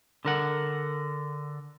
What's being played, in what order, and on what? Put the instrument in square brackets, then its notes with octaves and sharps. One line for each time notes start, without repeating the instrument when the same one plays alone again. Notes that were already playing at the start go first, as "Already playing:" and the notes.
[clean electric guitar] D3 A#4 F#5